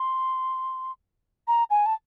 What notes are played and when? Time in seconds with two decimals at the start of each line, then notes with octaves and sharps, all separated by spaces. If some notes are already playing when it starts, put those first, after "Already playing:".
Already playing: C6
1.48 A#5
1.70 G#5
1.86 A5